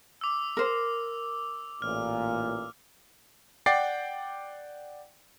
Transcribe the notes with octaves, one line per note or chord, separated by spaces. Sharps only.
D6 E6
A#4 C5
A1 A#2 F6
D5 F#5 G5 D6 A6 C7